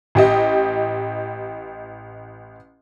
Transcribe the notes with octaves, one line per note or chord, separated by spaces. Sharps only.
A1 G4 D#5